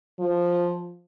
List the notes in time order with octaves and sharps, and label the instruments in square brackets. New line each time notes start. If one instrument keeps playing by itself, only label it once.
[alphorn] F3